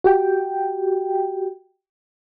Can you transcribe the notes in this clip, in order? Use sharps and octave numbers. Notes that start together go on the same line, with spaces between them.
F#4 G4 G5